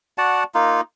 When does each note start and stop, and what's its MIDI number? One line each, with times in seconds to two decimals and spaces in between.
0.18 0.43 66
0.18 0.43 74
0.18 0.43 78
0.18 0.43 81
0.54 0.81 58
0.54 0.81 63
0.54 0.81 65